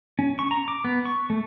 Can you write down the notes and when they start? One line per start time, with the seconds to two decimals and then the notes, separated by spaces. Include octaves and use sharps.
0.19 C#4
0.39 C#6
0.51 A#5
0.68 D6
0.85 B3
1.05 C#6
1.30 A3